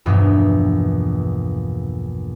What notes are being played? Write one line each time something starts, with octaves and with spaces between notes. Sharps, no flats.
A#1 E2 G2 B2